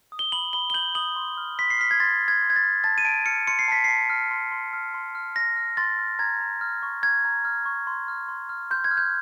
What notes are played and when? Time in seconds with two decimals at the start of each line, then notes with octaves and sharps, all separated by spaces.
0.12 D#6
0.19 G7
0.32 B5 F#7
0.53 B5 G7
0.70 G7
0.74 G6 F#7
0.95 D#6 F#7
1.16 C6
1.37 F6
1.58 C6 B6
1.70 C7
1.79 F6 B6
1.91 G#6
2.00 C6 A6
2.21 F6
2.28 G#6
2.43 C6
2.50 G#6
2.56 A6
2.63 F6
2.84 A5 A6
2.98 D#7
3.04 A5 D7
3.26 F6 C#7
3.47 C6 C#7
3.59 C7
3.68 A5 B6
3.84 A5 C7
4.10 F6
4.31 C6
4.52 C6
4.73 F6
4.94 C6
5.15 F6
5.36 C6 A#6
5.56 F6
5.77 C6 A6
5.99 F6
6.19 A#5 G#6
6.40 A#5
6.61 F6
6.83 C#6
7.03 A#5 G#6
7.25 A#5
7.45 F6
7.66 C#6
7.87 C6
8.08 F6
8.28 C6
8.49 F6
8.71 C6 G6
8.84 G#6
8.91 F6
8.97 G6